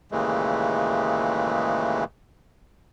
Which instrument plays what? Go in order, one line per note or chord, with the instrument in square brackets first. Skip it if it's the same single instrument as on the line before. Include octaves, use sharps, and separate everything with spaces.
[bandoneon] D#2 A#2 C#3 E3 G#3 A3